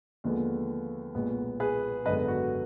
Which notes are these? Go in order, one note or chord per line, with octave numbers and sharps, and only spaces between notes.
D#2 D3 F3 G#3 B3
B1 A#2 G#3 B3
G#4 B4
G#1 F#2 D3 G#3 B3 B4 D#5
F#4